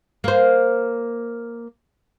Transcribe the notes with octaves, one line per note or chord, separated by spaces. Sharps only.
A#3 C5